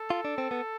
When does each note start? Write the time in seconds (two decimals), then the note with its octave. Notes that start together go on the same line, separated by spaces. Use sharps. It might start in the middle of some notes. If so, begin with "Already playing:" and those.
Already playing: A4
0.10 F4
0.25 D4
0.38 C4
0.51 B3